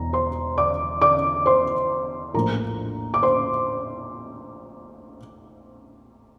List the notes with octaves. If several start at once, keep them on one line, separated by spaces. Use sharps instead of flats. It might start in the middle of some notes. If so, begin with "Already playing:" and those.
Already playing: E1 E2 A#5
C5 C6
D5 D6
D5 D6
C5 C6
A#1 A2 F3 A#4 A#5
D6
C5 C6